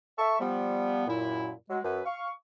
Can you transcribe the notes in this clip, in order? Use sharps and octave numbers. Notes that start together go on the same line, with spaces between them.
A4 E5 C#6
F3 G3 B3
F#2 A#2 E4
F#3 G#3
F#2 B4
F5 C#6